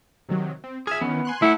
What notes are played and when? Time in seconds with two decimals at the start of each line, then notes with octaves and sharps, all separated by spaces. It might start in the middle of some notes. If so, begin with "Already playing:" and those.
0.29 C3 D#3 F#3
0.64 C4
0.87 G#4 E5 F6 G#6
1.01 D#3 E3 B3 C#4
1.25 G#5 C6 F#6
1.42 A3 E4 F#5